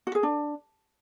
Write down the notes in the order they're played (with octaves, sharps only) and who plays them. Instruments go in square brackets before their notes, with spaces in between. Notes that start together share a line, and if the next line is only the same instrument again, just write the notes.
[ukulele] F#4
G#4
D4